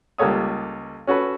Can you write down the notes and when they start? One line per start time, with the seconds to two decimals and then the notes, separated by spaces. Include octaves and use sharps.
0.18 C#2 G3 A#3 A4 C#5 D#6
1.07 C#4 F#4 A4 B4